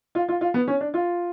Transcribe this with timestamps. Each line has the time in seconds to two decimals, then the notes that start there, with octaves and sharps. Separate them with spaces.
0.15 F4
0.29 F4
0.41 F4
0.54 B3
0.68 C#4
0.81 D4
0.94 F4